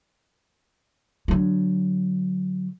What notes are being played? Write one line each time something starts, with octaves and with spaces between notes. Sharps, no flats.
D3 F#3